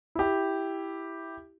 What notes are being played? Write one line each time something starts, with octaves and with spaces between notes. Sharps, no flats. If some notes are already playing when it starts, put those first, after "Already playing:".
E4 G4